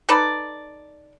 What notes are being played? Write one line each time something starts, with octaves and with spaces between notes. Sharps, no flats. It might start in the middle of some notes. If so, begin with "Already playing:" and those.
D#4 A4 B4 D5